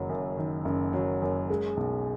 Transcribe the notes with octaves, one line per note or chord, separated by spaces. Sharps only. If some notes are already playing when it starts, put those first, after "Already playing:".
Already playing: F#1 D#3 F#3
F#2
D#3
F#1
F#3
F#2
G#3
B1